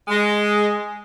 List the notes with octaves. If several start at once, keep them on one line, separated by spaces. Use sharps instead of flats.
G#3